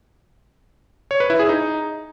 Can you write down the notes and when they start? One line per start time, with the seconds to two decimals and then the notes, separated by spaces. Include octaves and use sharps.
1.11 C#5
1.20 B4
1.30 E4
1.39 G#4
1.49 D#4